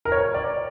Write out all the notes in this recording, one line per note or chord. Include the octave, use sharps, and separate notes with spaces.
A#4
C#5
D5